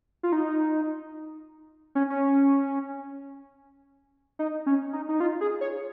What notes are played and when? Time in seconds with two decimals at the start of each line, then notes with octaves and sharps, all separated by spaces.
0.23 F4
0.32 D#4
1.95 C#4
2.10 C#4
4.39 D#4
4.66 C#4
4.93 D#4
5.09 D#4
5.20 F4
5.41 G#4
5.61 C#5